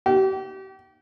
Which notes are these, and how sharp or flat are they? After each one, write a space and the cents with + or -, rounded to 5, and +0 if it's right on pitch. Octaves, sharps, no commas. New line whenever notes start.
G4 -35